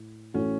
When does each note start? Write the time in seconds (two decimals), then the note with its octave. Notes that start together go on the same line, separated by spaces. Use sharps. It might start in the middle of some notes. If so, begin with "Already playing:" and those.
Already playing: A2
0.34 A1 A2 A3 C#4 F#4 A4